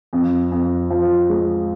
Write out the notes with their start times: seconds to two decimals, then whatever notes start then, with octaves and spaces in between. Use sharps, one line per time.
0.13 F2
0.52 F2
0.90 F3
1.30 G#3